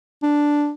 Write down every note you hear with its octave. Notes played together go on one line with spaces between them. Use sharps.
D4